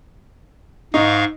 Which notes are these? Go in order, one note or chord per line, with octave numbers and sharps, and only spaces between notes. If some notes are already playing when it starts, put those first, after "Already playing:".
G#2 D#4 F5 C#6